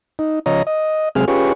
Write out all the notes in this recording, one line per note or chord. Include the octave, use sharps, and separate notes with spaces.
D#4
C#3 F3 C#5 D#5 A#5
D#5
C3 F#3 G#3 C4 G#4 F6
C#4 F4 G4 G#4 B4 C#6